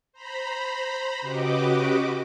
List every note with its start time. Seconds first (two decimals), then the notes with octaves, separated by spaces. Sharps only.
0.13 C5 A#5 B5
1.21 C#3 F#4 G4 B4 D#5 D6